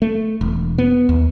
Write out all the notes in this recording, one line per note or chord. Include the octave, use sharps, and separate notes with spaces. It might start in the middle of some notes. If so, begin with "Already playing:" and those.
A3
E1
B3
D#2